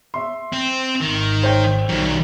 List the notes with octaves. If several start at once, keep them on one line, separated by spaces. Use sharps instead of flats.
E5 C6
C4
G#1 D#3
C5 C#5 G5
B1 D#3 F#3 G3